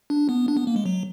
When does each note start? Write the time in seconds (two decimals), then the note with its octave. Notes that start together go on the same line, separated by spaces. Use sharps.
0.10 D4
0.29 B3
0.48 D4
0.57 B3
0.67 A#3
0.76 G#3
0.86 F#3